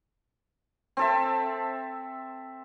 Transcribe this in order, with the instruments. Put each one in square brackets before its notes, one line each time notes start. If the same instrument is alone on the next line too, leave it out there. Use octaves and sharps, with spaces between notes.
[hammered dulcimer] C4 A4 E5